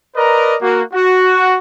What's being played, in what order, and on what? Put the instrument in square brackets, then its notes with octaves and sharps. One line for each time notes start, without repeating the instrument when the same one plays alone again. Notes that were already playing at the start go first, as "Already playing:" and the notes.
[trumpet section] A#4 B4 D5 D#5 A#5
A#3 F#4
F#4